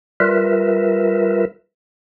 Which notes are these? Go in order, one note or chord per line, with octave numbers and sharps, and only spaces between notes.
G3 F4 A#4 B4 E5